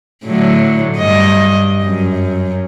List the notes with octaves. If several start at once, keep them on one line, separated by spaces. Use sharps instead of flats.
A2 D3 F#3
G2 D#5
F#2